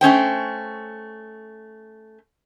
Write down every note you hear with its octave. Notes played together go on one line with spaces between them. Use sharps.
A3 C#4 C5 G5